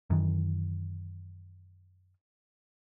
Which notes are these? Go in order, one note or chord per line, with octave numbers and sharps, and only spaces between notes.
F#2 D#3 E3